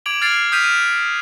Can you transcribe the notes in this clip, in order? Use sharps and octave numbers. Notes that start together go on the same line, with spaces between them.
D6 G#6 D7 F7 F#7
F6 G#6 A6 C7 D7 F7
D#6 F6 G6 B6 D#7 F7
F6 D#7